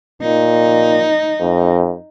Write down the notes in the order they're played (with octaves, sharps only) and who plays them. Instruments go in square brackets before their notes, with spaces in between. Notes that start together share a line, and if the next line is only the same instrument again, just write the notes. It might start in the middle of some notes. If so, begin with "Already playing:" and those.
[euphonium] A#2 [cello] D#4
[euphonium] F2